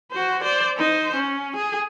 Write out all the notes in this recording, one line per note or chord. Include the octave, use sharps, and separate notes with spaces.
F#4 C5
C5 D5
D#4 C5
C#4
G#4